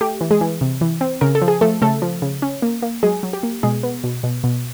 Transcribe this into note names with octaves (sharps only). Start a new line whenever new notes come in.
A3 G4
E3
G#3 G#4
E3
C3
E3
C4
C#3 A#4
A4
F3
G#4
F3 A3 A4
C#3 A3 A4
F3
C#3
C#4
A#3
A#3
F#3 G#3 G#4
F#3
G4
A#3
B2 G#3 G#4
B3
B2
B2
B2